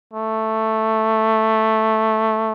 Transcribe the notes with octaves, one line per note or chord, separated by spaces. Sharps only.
A3